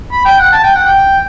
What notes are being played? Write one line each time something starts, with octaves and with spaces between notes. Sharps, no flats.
B5
G5
F#5
A5
G5
F#5
G5